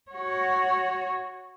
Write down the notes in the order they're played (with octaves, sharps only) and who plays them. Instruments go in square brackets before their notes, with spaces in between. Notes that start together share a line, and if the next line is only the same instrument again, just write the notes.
[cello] F#4 C#5